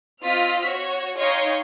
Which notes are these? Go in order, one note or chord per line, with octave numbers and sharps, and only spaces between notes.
C4 F4 D#5 F6 B6
F#4 C#5
D#4 C#5 D#5 F5 G5 C6